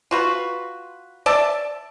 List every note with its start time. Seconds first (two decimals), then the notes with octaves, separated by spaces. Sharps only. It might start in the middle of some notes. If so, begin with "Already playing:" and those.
0.11 F4 F#4 B4
1.26 D5 E5 A5